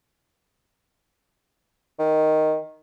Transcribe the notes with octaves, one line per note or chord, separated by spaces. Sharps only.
D#3